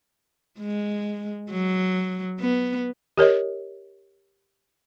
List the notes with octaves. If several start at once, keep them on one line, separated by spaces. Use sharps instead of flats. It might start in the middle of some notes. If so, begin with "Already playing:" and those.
G#3
F#3
B3
G4 A#4 C#5 D#5